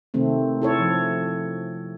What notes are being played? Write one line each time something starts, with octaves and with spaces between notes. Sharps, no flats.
C3 D#3 A3 C4
E4 A4 C#5
F3